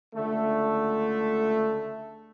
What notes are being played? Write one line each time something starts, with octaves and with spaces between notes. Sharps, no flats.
C#2 D3 A3